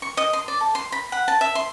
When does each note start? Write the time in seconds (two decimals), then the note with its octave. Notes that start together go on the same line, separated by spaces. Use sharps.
0.02 C#6
0.17 D#5
0.33 C6
0.48 D5
0.61 A4
0.75 C6
0.92 B5
1.12 F#5
1.28 A5
1.41 E5
1.55 C6